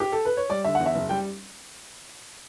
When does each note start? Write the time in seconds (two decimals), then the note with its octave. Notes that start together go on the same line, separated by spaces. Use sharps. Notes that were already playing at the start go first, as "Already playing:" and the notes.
0.00 G4
0.12 A4
0.25 B4
0.37 C#5
0.49 G3 D5
0.64 D3 E5
0.75 E2 F#5
0.86 E5
0.95 F#1
1.09 G3 G5